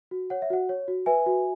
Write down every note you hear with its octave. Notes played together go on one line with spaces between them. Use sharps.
F#4
C#5 F#5
E5
F#4 F#5
C#5
F#4
B4 E5 G#5
F#4